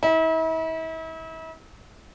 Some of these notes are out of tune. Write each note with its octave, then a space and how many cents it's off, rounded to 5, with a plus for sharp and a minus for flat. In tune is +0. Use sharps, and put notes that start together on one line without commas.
E4 -40